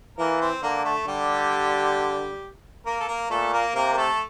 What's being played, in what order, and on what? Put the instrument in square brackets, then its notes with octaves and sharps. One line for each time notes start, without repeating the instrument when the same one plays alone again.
[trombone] E3 [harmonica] A#3 A#4
[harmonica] C4 C5
[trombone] D3 [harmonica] A#3 A#4
[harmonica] A3 A4
[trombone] D3 [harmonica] G3 G4
[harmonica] A#3 A#4
A4
A#3 A#4
[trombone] A#2 [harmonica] A3 A4
[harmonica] A#3 A#4
[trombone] C3 [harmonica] A#3 A#4
[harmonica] A#4
A3 A4